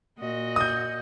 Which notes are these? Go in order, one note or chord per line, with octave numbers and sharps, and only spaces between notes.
A#2 F#4 D#5
D#6 G6